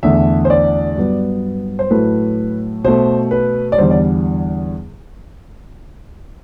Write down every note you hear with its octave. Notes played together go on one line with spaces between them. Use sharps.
E2 D3 A3 E5
C5
D5
G2 F#3 B3
C5
A2 F#3 A3 B4
B2 A3 C5
B4
D5
E2 D3 G3 C5
D5